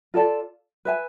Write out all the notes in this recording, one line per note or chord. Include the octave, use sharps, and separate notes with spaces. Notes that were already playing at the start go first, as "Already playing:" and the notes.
F4 A4 D5 A5
B4 E5 G#5